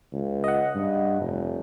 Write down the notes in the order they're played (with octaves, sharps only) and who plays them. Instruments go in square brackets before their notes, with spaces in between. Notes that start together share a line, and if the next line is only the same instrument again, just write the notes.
[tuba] C#2
[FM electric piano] D#5 F#5
[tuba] G2
F1